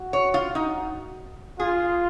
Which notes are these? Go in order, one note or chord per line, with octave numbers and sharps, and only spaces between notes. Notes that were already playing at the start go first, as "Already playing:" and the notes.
Already playing: F#4
C#5
F4
D#4
F4 G#4